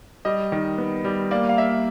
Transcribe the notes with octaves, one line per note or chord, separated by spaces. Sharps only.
G3 D#5
D#3
B3
G3
A#3 D5
F5
A#3 E5